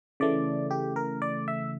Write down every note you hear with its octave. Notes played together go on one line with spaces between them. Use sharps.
C#3 E3 A3 D5
G4
A#4
D5
E5